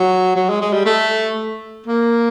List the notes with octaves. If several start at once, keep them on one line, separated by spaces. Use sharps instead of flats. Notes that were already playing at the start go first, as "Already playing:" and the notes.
Already playing: F#3
F#3
G#3
G#3
G3
A3
A#3